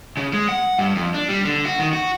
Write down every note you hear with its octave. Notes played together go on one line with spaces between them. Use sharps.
C#3
G#3
F#5
G2
F2
D4
G3
D3
F#4
D#3
F#4